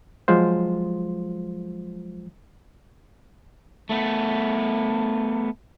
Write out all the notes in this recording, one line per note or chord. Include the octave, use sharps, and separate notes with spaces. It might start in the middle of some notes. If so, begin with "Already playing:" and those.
F3 F#3 G#3 F4 C5
A3 B3